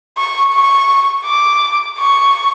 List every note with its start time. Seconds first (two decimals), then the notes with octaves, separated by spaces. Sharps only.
0.18 C#6
0.53 C#6
1.26 D6
1.99 C#6